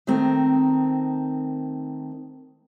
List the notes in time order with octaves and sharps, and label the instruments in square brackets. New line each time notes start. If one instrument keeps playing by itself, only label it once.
[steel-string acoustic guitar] D#3 A3 C4 A#4